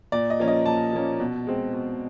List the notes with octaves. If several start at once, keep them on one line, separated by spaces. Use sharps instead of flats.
A#2 D5
D#5
F3 A#3 C#4
D#5
A#2 A5
F3 A#3 C#4
B2
G#3 C4
B2